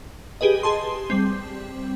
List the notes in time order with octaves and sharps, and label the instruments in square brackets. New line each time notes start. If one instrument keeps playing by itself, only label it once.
[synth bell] G4 G#4 B4 D#5
G#4 A5 C6
G3 C4